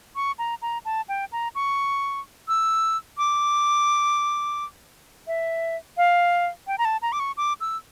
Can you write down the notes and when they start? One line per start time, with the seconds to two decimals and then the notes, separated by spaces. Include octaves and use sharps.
0.16 C#6
0.39 A#5
0.62 A#5
0.85 A5
1.09 G5
1.32 A#5
1.55 C#6
2.48 E6
3.18 D6
5.27 E5
5.97 F5
6.67 G5
6.78 A#5
6.85 A5
7.02 A#5
7.12 D6
7.20 C#6
7.37 D6
7.61 E6